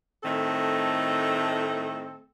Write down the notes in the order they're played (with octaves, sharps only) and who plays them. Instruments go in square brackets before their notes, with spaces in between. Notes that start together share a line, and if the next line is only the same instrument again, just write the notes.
[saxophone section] A2 D#3 A3 C4 A4